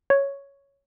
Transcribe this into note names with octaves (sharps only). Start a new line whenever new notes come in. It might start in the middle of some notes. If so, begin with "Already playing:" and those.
C#5